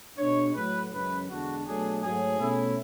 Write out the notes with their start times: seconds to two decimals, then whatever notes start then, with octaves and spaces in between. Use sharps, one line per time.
0.18 B2 G#3 D4 C#5
0.55 A2 F#3 A3 B4
0.92 F#2 C#3 E3 G#3 B4
1.28 E2 D3 G#3 D4 F#4
1.65 B2 F#3 A3 D4 G#4
2.02 G#2 F#3 A3 G#4
2.39 B2 A3 C#4 E4